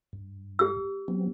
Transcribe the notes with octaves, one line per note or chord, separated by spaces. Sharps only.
G2
G4 E6
F#3 B3 C4